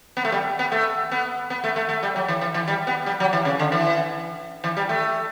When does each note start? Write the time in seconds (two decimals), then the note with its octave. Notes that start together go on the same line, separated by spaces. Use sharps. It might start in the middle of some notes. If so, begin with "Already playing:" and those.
0.17 B3
0.25 A3
0.32 G3
0.59 B3
0.72 A3
1.12 B3
1.50 B3
1.64 A3
1.76 A3
1.89 A3
2.03 G3
2.16 F#3
2.28 E3
2.41 E3
2.54 E3
2.68 G3
2.87 B3
3.06 G3
3.20 F#3
3.33 E3
3.45 C#3
3.59 D3
3.72 E3
4.64 E3
4.77 G3
4.89 A3